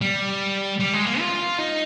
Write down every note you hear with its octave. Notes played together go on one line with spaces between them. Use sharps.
G3
G3
G#3
A#3
F4
D#4